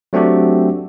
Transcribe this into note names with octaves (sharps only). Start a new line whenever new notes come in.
F#3 A3 C4 D4 F#4 G4